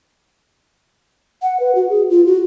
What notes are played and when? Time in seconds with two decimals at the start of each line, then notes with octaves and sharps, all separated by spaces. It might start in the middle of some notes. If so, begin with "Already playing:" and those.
1.42 F#5
1.60 B4
1.75 F#4
1.90 G#4
2.10 F4
2.26 F#4